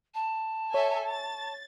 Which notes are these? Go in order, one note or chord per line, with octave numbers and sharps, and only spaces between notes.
A5
A4 C#5 E5 G#5
A6